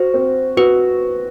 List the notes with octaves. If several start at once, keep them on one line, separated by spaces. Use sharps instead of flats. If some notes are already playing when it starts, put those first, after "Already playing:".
Already playing: F#4 C5
C4
F#4 B4